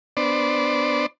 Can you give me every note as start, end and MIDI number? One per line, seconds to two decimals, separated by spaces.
0.17 1.06 59
0.17 1.06 62
0.17 1.06 72
0.17 1.06 74